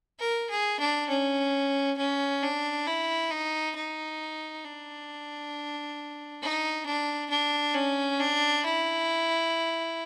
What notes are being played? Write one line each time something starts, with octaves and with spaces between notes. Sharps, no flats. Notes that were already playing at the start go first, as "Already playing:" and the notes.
A#4
G#4
D4
C#4
C#4
D4
E4
D#4
D#4
D4
D#4
D4
D4
C#4
D4
E4